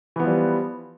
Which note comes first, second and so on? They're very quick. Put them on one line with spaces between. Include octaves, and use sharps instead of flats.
E3 B3 F3 G3